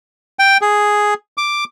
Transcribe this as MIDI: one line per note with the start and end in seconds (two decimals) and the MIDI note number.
0.39 0.57 79
0.61 1.14 68
1.37 1.64 86